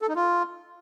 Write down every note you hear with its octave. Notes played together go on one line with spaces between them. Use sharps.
A4
D#4
F4